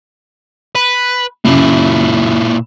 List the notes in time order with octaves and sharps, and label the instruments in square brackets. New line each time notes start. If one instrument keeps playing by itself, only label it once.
[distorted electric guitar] B4
[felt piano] F#2 C#3 [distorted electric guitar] A#2 E4